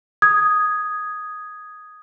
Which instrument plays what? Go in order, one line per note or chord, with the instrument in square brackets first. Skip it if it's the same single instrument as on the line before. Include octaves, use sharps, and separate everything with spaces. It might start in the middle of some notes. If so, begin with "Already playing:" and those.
[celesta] D#6 G#6